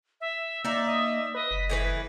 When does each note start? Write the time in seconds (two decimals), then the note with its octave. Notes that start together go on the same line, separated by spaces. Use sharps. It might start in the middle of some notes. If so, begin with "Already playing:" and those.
0.21 E5
0.65 A#3 D#4 D5 E5
0.88 D#5
1.35 B4 D#5
1.51 F#1 B6
1.70 A2 E3 B4